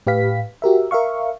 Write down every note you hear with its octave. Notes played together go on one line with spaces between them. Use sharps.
A2 G4 B4 F5 B6
F#4 G4 A#4 E5
A#4 E5 F5 C#6